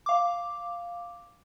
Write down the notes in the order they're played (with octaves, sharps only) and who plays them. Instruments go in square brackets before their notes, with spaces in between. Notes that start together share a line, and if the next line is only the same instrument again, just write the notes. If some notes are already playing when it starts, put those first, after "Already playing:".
[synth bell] F5 D6